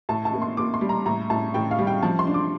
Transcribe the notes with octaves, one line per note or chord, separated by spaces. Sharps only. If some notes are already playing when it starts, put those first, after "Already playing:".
A2 A5
A5
A#3
C6
A#3 D6
C6
G3
A#5
A2 A#5
A2 A5
A2 G5
F5
G3
G5
F3 A5
C6
D4
D6